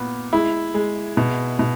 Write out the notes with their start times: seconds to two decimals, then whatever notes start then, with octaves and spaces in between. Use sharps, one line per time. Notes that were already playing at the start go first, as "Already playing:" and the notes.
Already playing: A#2 B3
0.33 G#3 E4
0.74 G#3
1.17 B2
1.59 B2